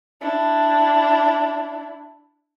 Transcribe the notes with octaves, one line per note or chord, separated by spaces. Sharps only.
D4 E4